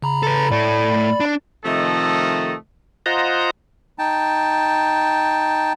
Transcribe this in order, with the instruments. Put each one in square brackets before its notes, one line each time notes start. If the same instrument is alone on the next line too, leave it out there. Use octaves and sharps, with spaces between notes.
[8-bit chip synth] C#3 A#5 B5
[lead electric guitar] A4 B4
[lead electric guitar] A2 A3 [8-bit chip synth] D5 B5
[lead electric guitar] D4
[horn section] C3 D#3 F3 A3 A4 D#5
[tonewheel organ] F4 C5 D#5 F#5 A#5
[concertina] D#4 G5 A5